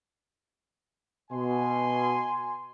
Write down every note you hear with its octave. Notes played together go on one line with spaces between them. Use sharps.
B2 G#5 C6